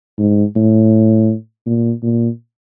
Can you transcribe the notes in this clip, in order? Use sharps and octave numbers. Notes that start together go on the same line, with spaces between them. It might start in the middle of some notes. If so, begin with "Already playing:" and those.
G#2
A2
A#2
A#2